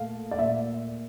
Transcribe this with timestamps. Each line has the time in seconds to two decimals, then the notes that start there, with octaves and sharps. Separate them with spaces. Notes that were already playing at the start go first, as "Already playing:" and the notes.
Already playing: A#2 A3 F5
0.31 D5
0.38 A#2 E5